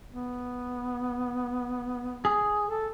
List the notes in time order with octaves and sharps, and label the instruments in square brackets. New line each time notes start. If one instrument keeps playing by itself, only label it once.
[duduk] B3
[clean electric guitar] G#4
[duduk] A4